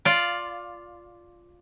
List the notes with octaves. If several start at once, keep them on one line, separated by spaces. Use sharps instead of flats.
F4 D5